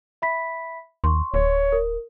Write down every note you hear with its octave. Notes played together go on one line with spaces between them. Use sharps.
E5 B5 B6
D#2 C6 C#6
D1 C#5
A#4